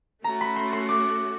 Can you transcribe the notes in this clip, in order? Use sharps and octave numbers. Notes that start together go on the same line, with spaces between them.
A3 C#4 F#4 A#5
B5
C6
C6
D6